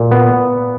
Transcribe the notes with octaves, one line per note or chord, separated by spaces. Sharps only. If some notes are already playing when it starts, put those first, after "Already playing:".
Already playing: A#2
B3